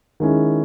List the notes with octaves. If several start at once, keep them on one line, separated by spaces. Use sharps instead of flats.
D#3 G#3 C#4 E4